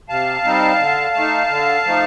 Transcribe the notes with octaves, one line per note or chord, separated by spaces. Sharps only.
C3 F5 A5
G3 C4 D#4
D3
A3 D#4
D3
F3 A3 D#4